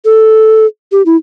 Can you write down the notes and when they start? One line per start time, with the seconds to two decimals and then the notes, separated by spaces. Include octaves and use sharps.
0.05 A4
0.92 G4
1.06 E4